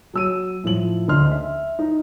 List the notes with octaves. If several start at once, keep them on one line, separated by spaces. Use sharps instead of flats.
F#3 E6 D#7
A2 F3 F#7
D2 D3 D#5 C6 F6
E5
D#4